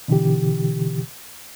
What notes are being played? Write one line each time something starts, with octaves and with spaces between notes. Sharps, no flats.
B2 D3 E3 G4